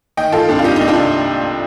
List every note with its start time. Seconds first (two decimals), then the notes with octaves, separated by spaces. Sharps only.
0.17 D#3 D#5 G5
0.32 D#3 F4 A4
0.48 C2 D4
0.59 F4
0.64 C2 D#4 G4
0.76 C2 D#4
0.88 D4 F4
0.96 C3